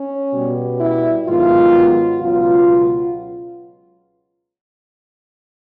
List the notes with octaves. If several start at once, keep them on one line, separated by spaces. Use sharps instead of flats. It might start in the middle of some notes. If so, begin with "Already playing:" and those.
Already playing: C#4
B2 G3 B3
E4
G#2 D#3 F#3 B3 F4
C#2 B2 F#3 B3 F4